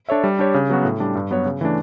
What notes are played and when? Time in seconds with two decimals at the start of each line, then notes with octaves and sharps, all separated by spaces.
0.09 D4 A4 C#5 E5
0.24 G3
0.39 D4 G4 C#5
0.54 C#3
0.70 F#3 B3 F#4
0.85 A2
1.00 G3 D4
1.15 G2
1.31 F#3 B3 F#4 C#5
1.45 C#3
1.61 E3 A3 D4